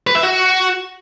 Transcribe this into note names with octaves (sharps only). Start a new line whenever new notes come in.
B4
E5
F#4